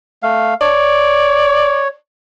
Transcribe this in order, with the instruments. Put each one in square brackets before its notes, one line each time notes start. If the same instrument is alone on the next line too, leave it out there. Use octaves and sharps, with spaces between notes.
[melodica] A3 F5
[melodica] C#5 [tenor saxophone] D5